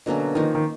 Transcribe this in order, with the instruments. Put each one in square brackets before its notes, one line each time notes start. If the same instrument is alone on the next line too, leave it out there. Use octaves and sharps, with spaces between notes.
[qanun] B2 F#3 A#3 C#4 [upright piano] D3
[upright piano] D#3 [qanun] F3 A#3 D#4
[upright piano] D#3